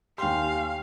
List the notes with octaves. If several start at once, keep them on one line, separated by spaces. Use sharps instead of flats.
D#2 G4 F5 G5 G#5 C6